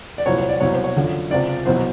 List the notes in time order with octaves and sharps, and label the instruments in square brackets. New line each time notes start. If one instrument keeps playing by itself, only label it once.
[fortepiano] D5
C2 A#2 F#3 C#5
C#5
D5
C2 B2 F#3 C#5
C5
C#5
F#2 D3 F3
C#2 C3 F3 D5
C2 B2 F#3 C5